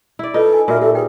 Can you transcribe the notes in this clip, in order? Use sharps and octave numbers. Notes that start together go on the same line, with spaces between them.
E4 D5
D#4 F4 A4 B4 D#5
G#5
A#2 F4 F#4 A#4 E5
G4 A4 E5
G#4 B4 G5